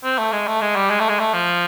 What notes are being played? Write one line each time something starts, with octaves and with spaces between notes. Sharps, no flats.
C4
A3
G#3
A3
G#3
G3
G#3
A3
G#3
A3
F3